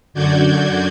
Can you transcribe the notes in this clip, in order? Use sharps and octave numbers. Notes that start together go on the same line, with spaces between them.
F#2 D3 F#4 D5 G6 G#6